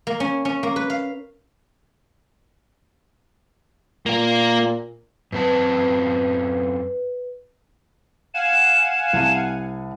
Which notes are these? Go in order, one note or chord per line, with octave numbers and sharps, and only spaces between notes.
A#3
C#4
C#4
A#3
B4
F5
A#2 A#3 A#4
F#2 C4 B4 A5
F5 F#5 G#5 E7
C2 A5 D#7